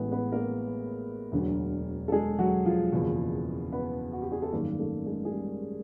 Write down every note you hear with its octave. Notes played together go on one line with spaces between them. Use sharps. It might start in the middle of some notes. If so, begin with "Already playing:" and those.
Already playing: A1 A2 E3 G#3 B3 G#4 B4
B3 B4
A#3 A#4
E1 D2 D3 F#3
A4
G#3 G#4
F#3 F#4
F3 F4
F#1 E2 B2
B3 B4
F#4
G4
G#4
A4
G#1 F#2 D#3 G3 A#3 A#4
A3 A4
G#3 G#4
G#4
G3 G4